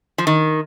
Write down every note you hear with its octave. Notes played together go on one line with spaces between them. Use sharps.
F3
D#3